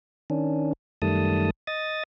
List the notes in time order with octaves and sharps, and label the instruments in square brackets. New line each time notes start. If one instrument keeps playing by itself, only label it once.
[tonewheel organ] D#3 C#4 D4
F#2 D#3 G3 A3 A5 D#6
D#5 D#6 A6